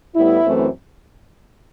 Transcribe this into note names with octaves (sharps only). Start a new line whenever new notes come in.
A2 G3 B3 E4
F#2 E3 A3 C4